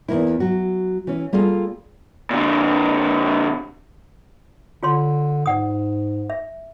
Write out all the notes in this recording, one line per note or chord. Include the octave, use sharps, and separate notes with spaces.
E2 A#3 E4
F#3 F#4
E3 C#4
G3 A#3 F4 G#4 A4
A#2 D3
D3 F4 C#5 C6
G#2 D5 F#5 D#6
E5